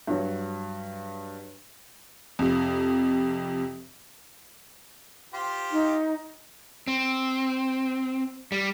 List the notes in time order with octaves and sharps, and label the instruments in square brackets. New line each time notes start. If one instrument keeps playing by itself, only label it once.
[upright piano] G2 F#3
[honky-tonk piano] F2 C3
[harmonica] F4 G4 C5
[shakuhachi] D#4
[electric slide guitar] C4
G3